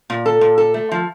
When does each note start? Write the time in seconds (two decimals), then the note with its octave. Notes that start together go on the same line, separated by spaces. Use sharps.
0.10 A#2
0.26 A4
0.41 A#2
0.58 A4
0.74 A3
0.92 F3